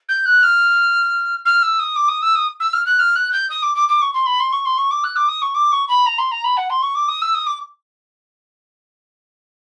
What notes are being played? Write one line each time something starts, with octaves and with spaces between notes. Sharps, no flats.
G6
F#6
F6
F6
E6
D#6
D6
D#6
E6
D#6
E6
F6
F#6
F6
F#6
G6
D#6
D6
D6
D6
C#6
C6
B5
C6
C#6
C6
C#6
D6
F#6
D6
D#6
C#6
D6
C#6
B5
A#5
C6
A#5
B5
F#5
C6
C#6
D6
D#6
E6
D#6
D6